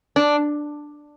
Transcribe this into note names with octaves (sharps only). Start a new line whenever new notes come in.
D4